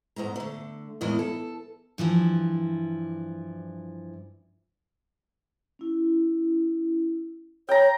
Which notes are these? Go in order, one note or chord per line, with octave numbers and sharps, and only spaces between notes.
E2 G#2 A3 A#5
D3 A3
E2 A2 E3 G#3 A#3 E4
A4
G2 E3 F3 E4
C#4 E4
C#5 G5 G#5 A#5 B5